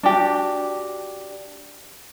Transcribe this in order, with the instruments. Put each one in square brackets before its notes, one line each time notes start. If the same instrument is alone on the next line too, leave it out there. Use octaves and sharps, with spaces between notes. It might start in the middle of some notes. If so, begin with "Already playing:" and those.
[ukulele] D4 F#4 G4